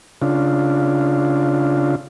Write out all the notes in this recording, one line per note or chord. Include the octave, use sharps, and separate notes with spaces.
C#3 D4 F4